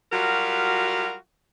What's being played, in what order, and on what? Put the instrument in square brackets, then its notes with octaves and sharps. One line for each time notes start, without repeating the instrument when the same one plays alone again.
[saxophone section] F#3 G3 F4 F#4 A#4